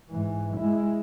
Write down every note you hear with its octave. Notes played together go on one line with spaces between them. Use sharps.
G#2 E3
G#3 E4